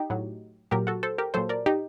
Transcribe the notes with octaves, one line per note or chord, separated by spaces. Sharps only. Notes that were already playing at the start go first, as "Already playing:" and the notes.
Already playing: D#4 G4
A2 F#3
A#2 F#3 G4 A#4
F#4 A4
A4 C5
G4 A#4
A#2 F#3 A4 C5
A#4 D5
D#4 G4